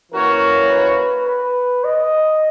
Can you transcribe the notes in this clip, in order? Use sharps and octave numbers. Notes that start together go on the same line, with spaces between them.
E3 A#3 C#4 F#4 A#4 C#5
B4
B4
D#5